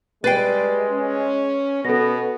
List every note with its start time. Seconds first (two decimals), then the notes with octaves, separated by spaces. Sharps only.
0.24 G3 G#3 B4 G5 A6 C7
0.90 C#4
1.85 B2 B3 A4 A#6